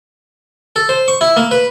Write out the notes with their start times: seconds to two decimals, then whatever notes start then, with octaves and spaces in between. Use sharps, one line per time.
0.76 A4
0.89 C5
1.08 C#6
1.21 E4
1.37 A#3
1.51 B4